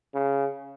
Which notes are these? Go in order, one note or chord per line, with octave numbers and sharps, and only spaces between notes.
C#3